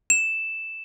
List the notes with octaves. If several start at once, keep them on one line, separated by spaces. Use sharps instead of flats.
E7